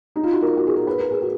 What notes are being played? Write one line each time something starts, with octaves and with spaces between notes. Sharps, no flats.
D#4
F4
F#4
A#4
F#4
G#4
A#4
B4
A#4
G#4
F#4